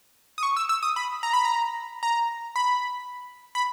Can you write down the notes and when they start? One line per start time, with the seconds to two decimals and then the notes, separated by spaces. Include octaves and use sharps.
0.38 D#6
0.43 C#6
0.57 E6
0.69 E6
0.83 D#6
0.96 B5
1.23 A#5
1.33 B5
1.45 A#5
2.03 A#5
2.56 B5
3.55 B5